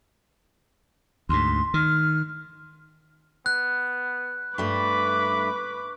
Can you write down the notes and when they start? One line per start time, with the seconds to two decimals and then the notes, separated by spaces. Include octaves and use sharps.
1.29 D2 G#2 C6
1.74 D#3 F6
3.46 B3 F#6
4.58 G2 A3 B4 B5 C#6 D6